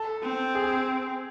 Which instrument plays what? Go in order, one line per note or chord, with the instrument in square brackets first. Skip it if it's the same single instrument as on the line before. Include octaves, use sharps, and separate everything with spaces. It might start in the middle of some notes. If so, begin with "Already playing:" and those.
Already playing: [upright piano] A4
[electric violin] C4
[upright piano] G#4